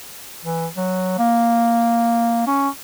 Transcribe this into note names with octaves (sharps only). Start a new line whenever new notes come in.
E3
F#3
A#3
C#4